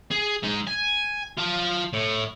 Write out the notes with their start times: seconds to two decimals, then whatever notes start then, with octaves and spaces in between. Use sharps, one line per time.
0.11 G#4
0.43 G#3 D#4
0.67 G#5
1.37 F4 A5
1.93 A2